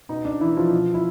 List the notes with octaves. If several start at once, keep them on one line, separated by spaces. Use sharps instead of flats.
B2 D#4
D4
B2 E3 E4
F3 F4
B2
E4